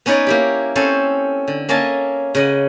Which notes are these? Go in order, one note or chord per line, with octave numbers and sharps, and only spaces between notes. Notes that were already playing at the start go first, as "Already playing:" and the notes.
B3 C#4 D#4 B4 C#5 D5
A#3 E4 G4
C4 C#4 A4 C5 C#5
D3
A#3 C#4 D#5 E5 G#5 A5
C#3 D#5 F#5